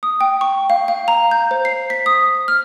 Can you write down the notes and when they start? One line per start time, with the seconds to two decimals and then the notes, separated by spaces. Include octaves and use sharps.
0.03 D#6
0.21 G5
0.41 C#6
0.70 F5
0.88 F5
1.08 A#5
1.31 G6
1.51 C5
1.65 C7
1.90 B6
2.06 D#6
2.48 F6